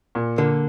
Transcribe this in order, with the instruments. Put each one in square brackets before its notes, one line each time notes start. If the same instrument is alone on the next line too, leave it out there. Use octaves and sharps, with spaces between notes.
[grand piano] A#2
[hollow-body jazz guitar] D3 [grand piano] A#3